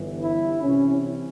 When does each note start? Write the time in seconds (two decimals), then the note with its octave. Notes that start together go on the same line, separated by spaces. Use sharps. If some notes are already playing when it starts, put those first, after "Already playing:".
Already playing: G1 G2 E3
0.23 E4
0.63 C2 C3 E3 C#4